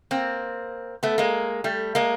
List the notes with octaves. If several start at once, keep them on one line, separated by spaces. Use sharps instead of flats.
A#3 C4
A3 B3
G#3 A#3
G3 A3
G#3 A#3